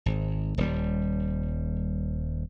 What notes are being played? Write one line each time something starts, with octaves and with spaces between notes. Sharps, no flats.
G#1
D#1 G3